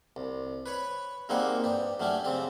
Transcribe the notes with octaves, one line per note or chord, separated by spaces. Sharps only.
C2
B4 C#5 B5
G3 A#3 C4 D#4 G#4 F#5
G2 G4
F#3 A3 C#4 D4 G4
C#3 C4 G4